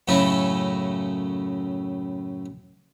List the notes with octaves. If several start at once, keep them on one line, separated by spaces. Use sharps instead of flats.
F#2 A2 C#3 A3 E4